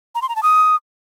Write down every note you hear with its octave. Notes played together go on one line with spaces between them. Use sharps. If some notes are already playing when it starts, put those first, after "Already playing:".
A#5
C6
A#5
A5
D#6